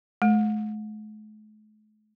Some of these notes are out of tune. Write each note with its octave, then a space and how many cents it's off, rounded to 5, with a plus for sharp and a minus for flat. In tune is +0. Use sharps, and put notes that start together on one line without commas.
A3 -45